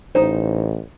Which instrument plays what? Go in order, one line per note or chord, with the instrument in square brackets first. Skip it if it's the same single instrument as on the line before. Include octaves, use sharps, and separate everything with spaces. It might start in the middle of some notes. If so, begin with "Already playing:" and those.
[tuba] A1 [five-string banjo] D#4 C5